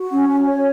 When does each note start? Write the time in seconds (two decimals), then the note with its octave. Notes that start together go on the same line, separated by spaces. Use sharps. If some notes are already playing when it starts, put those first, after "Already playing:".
Already playing: F#4
0.11 C#4
0.29 C#4
0.46 C#5